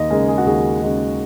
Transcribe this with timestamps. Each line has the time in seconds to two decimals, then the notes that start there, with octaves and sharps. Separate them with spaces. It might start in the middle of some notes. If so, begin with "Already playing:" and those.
Already playing: D#2 D#5
0.11 C#3 G#3 A#4
0.29 G#4
0.38 F#4
0.46 D#2 G#4
0.82 C#3 G#3